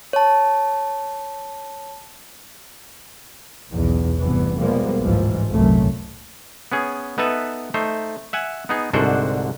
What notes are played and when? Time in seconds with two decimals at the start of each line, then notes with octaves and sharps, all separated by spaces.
0.13 C#5 A5
3.72 B1 E2
4.19 F1 G2 E3 B3
4.59 B2 F3 G3 G#3 A#3 B3
5.01 A1 D2 G#2 E3 F3
5.51 F1 C2 F#2 A#2 A3
6.72 B3 C#4 G#4
7.18 B3 D#4 A4 B4 E5
7.74 A3 D#4 C5
8.33 E5 F#5 G#5
8.69 B3 D#4 G#4
8.93 C2 G#2 D3 D4 F#4 C5